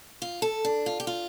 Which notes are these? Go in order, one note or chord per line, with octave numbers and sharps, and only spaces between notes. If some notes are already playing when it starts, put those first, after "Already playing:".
F4
A4
D4
F4
G4
F4